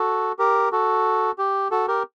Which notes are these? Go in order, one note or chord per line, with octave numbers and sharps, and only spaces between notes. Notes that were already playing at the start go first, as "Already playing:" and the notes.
Already playing: F#4 A4
G4 A#4
F#4 A4
G4
F#4 A4
G4 A#4